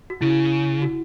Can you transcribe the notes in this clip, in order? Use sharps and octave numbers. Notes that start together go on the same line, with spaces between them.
F#4
C#3 E4
F#4